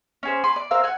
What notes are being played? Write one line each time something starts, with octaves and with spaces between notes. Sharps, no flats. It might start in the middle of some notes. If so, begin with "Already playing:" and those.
C#4 G#4 C5
G#5 B5 C6 D6
D5
C4 A#4 F5 E6
F#5 G#5